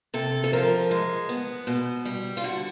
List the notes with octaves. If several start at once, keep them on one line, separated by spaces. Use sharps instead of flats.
C3 A4
A4
F3 A#4
G#3
B3
B2
G3
F4
D3 F#4